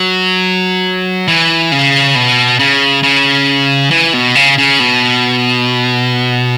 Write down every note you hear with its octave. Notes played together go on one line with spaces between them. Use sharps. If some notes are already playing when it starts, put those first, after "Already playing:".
Already playing: F#3
E3
C#3
B2
C#3
C#3
E3
B2
C#3
C#3
B2